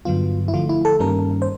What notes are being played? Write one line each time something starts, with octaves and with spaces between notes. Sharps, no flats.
G2 D3 F#3 B3 F4
E4
D3 F3 A3 F4
E4
A4
G2 D#3 G3 A#3 C#4 A#4
C5